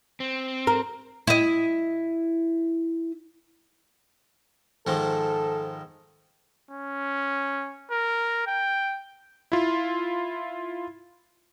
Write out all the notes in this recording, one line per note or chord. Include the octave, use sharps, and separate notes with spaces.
C4
A#4
E4 D#5
G#2 D#3 F3 A4
C#4
A#4
G5
E4 F4